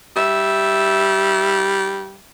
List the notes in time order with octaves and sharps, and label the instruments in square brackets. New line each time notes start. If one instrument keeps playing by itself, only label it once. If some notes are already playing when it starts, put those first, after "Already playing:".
[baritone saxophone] G3 [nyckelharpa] E5